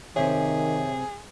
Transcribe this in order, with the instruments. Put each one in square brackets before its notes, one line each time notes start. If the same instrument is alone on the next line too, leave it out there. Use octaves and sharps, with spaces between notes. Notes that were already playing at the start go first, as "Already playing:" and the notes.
[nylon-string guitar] F#2 C3 C4 [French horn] D#3 [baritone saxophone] G#4 [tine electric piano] C#5 E5